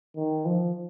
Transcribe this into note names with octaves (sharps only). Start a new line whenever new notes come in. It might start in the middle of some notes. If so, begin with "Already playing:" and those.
D#3
F3